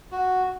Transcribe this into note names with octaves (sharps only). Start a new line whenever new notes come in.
F#4